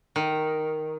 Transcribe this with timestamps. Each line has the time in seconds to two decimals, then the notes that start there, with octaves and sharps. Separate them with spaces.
0.16 D#3